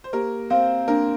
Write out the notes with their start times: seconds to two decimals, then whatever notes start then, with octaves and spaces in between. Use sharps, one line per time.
0.04 C5
0.13 A#3 G4 A#4
0.50 C4 C5 F5
0.88 A#3 D4 A#4